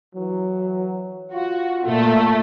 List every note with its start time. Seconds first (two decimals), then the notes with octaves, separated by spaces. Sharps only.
0.15 E3 F#3
1.33 F4 F#4
1.85 A#2 A3